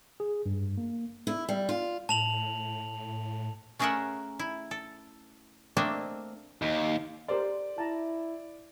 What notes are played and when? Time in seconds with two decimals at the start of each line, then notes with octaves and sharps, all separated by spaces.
0.20 G#4
0.46 G2
0.78 A#3
1.27 E4
1.49 G3
1.69 F4
2.09 A2 A5 F7 F#7
3.79 A3 C#4 G#4 A#4 E5 F#5
4.39 E4
4.71 A4
5.77 A3 A#3 C4 D4 D#5 E5
6.62 D#2
7.28 G4 A4 A#4 C5 D5 C6
7.78 E4 A5 A#5